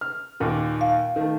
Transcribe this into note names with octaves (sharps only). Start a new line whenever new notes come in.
F6
D#2 A#2 D#3
F5
D#3 A3